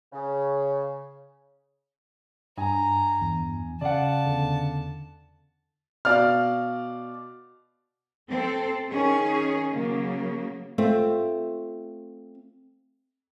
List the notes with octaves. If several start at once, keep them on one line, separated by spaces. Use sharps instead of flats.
C#3
G2 G#5 A#5
E2
C#3 D5 F5 F#5 A5
E2 D3
B2 D5 F5 F6
C4 A4
D#3 C#4 G#4
C#3 F#3 A#3
A3 C4 F4